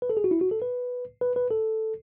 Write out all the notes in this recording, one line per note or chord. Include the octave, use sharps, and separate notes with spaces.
B4
A4
G#4
F#4
E4
F#4
A4
B4
B4
B4
A4